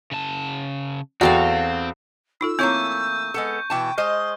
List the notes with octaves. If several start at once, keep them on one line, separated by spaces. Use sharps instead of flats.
C#3 A5
E2 C4 F#4 A4 F5 G5
D#4 F4 A4 E6
E3 A3 A#3 C4 E4 C#5 C#6 G6
G#3 B3 A4
B2 E3 G5 A5
G#3 C5 D#5 D#6 F6